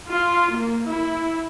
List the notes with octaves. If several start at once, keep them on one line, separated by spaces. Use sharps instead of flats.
F4
A#3
E4